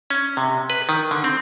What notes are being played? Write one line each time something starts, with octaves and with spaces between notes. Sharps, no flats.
C#4
C3
B4
D#3
D3
C4